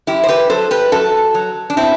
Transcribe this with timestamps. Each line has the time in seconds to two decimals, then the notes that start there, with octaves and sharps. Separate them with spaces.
0.07 F#2 E4 G4
0.24 C5
0.28 G4 B4
0.50 F#3 A4 C5
0.71 G4 B4
0.92 F#2 F#4 A4
1.34 F#3
1.70 D4
1.77 B2 C4 E4